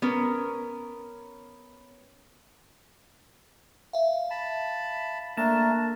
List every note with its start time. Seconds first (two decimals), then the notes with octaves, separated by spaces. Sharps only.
0.02 B3 C#4 A#4
3.93 E5 F5
4.31 A5 B5
5.37 A3 A#3 D4 A#4 A6 E7